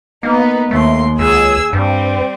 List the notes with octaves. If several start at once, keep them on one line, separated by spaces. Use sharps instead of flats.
A#3 B3 D#4
D#2 A3 C6
C#2 G#4 G#5 E6
G2 G3 C4